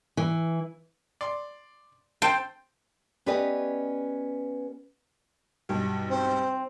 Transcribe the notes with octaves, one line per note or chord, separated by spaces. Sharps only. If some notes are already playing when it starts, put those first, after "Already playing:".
E3
D5 C6
C4 C5 G5 A5
B3 C#4 G4 B4 D5 D#5
B1 G2
C4 C5